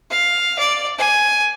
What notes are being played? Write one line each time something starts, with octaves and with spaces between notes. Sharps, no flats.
F5
D5
G#5